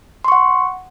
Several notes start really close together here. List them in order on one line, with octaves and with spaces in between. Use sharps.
C6 C#6 F#5